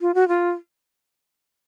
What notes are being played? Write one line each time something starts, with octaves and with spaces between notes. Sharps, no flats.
F4
F#4
F4